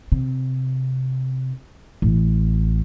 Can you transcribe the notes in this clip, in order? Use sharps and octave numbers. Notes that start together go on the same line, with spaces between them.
C3
A1